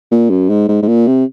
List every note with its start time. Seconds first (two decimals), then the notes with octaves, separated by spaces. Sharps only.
0.12 A#2
0.30 F#2
0.49 G#2
0.68 G#2
0.82 G#2
0.88 A#2
1.07 C3